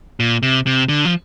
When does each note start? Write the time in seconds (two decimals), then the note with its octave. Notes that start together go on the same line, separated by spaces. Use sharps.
0.20 A#2
0.43 C3
0.67 C3
0.89 D3
1.05 F3